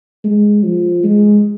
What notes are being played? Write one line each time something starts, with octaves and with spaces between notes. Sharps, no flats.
G#3
F3
G#3